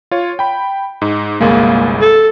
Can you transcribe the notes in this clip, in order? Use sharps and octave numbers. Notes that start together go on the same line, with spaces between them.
F4 C#5
G5 B5
G#2 D#4
G1 C2 G#3 A#3
A4